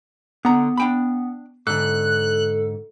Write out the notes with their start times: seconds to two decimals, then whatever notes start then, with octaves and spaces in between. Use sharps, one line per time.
0.45 D3 B3 A#5
0.77 D4 G5 B5
1.67 G#2 D3 A4 F#6